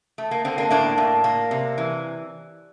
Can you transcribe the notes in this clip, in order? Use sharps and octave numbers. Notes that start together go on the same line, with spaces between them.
A3
A#3
D3 C4
A#3 D4
A2 A#3 D4
A2
A#3
C3
E3